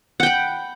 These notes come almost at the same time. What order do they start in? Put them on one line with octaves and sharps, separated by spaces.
F#5 G5 B5